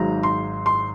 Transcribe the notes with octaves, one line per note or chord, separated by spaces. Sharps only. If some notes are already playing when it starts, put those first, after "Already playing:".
Already playing: G#1 G#2 F#3 A#5
C6
C6